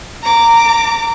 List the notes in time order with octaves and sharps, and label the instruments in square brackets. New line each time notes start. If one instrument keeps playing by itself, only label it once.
[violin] A#5 D6